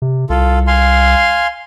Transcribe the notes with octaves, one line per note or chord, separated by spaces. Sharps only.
C3
C2 F4 A4
F5 G#5 C6